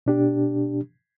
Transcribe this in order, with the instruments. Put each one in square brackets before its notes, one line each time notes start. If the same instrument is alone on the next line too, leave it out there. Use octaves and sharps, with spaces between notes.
[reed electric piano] B2 D4 G4